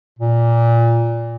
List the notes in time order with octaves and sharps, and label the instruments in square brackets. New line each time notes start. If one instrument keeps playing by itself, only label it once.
[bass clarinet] A#2